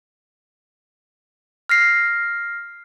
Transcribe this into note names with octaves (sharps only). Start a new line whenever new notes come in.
F6 A#6 C7